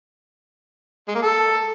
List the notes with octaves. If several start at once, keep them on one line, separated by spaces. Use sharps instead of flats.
G#3
A#3
A4